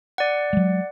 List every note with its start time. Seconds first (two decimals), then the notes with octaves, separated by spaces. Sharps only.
0.18 D5 F#5
0.53 F#3 G#3